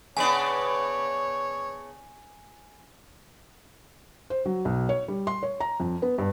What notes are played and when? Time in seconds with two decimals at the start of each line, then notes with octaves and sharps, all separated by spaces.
0.17 C#3 B3 D4 C#5 G#5 F#7
4.30 C5
4.45 F#3
4.65 B1
4.89 C#5
5.08 G3
5.27 C6
5.43 C#5
5.60 A#5
5.80 F2
6.02 B3
6.18 G2